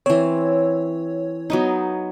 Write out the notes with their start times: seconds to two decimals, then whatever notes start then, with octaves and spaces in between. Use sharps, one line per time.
0.06 E3 C4 C#5
1.50 F#3 B3 D#4